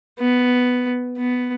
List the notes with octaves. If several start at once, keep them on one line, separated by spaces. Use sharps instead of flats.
B3
B3